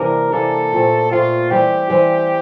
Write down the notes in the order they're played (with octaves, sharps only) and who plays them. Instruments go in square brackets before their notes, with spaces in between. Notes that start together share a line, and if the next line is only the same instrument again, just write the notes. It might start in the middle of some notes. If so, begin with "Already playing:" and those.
Already playing: [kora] C3 E3 G3 A#3 C4 D4 E4 [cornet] A#4
[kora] C3 E3 A#3 D4 [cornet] A4
[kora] A#2 A3 C4
[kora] A#2 A3 C4 [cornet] F4
[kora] E3 G3 C4 [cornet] G4
[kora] E3 G3 C4